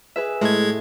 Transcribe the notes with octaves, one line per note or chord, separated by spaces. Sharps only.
G#4 B4 E5
A2 G#3 G#6